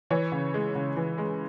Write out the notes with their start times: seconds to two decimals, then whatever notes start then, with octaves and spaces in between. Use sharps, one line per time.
0.10 E3 C#5
0.32 C#3
0.54 G#3
0.75 C#3
0.96 E3
1.18 G#3